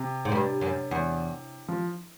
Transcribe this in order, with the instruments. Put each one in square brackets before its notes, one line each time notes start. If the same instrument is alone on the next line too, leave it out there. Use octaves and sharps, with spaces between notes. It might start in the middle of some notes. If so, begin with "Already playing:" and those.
Already playing: [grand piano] C3
[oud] G#2
G2
F#2
E2
[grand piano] F3